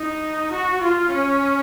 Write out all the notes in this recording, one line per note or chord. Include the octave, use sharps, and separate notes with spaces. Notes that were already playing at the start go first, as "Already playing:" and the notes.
Already playing: D#4
F#4
F4
C#4